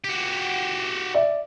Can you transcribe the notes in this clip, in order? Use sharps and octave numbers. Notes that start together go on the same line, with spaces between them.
F#4 G4
D5 E5